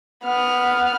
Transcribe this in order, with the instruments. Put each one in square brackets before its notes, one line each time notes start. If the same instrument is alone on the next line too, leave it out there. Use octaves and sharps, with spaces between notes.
[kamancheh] B3 F6